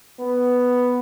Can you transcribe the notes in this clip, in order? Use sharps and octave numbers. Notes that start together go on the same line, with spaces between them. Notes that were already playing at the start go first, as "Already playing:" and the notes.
B3